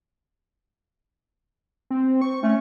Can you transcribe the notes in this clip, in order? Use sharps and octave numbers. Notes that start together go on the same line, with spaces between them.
C4
C#6
A3 C#4